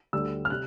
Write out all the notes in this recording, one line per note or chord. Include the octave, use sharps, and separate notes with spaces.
D2 D3 G3 E6
F6
C3 F#6